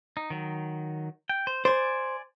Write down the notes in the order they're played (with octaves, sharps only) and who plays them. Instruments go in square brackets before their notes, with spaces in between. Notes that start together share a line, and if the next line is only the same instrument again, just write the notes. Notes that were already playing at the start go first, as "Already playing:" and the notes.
[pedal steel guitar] D#4
D#3 F#3
G5
C5
[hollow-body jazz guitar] C5 [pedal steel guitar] D5 G#5